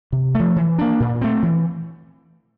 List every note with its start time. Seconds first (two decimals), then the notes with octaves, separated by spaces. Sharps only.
0.12 C3
0.35 F3 A3
0.56 E3
0.79 A#3 D4
1.00 A#2
1.21 A3 C4
1.43 E3